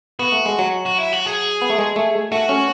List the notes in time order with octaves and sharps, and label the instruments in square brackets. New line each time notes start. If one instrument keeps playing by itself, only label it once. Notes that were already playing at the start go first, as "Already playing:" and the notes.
[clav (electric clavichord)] B3 [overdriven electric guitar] F#4
[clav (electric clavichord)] A3
G#3
F#3
[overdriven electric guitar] F#4
E4
F#4
G#4
[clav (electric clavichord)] B3
A3
G#3
A3
[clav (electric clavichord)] A3 [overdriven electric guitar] F#4
[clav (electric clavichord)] C#4